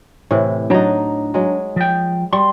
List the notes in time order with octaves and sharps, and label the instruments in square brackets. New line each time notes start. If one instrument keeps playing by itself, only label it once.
[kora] A2 C3 E3
[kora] F#3 D#4 [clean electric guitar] D4 A#5
[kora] F#3 G#3
[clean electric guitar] F3 G5
[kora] G3 [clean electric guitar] C6